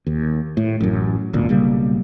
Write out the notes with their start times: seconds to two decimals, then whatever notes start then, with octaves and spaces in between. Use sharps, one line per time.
0.07 D#2
0.57 A2
0.80 A1 F#2
1.33 D#1 G#1 D2 A#2
1.49 B1 C#3 G3 A#3